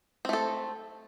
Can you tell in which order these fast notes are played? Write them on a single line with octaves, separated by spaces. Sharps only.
C4 A3 A4